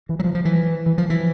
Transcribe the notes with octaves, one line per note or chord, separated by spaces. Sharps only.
E3
F#3
F3
F3
E3
E3
F3
E3